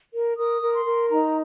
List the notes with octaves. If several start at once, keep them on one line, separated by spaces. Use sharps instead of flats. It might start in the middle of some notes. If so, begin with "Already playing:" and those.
A#4
A#4 D#6
A#4
C6
A#4
D#4 A#5